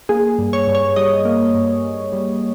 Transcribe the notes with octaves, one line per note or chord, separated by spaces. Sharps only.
A#3 G#4
G2
C#5
G2
C#5
G3 D#5
A#3
G2
G2
G3